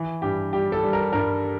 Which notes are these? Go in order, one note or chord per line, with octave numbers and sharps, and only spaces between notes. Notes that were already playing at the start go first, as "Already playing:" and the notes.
Already playing: E3
G2 G4
G3 G4
A4
G3
A#4
G2 A#4